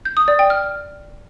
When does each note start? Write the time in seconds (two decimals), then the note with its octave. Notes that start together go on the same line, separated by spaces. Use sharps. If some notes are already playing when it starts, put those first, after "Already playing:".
0.05 G6
0.17 D#6
0.28 D5
0.39 G5
0.50 F6